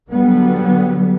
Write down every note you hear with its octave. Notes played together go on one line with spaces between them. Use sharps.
D3 F#3 G3 B3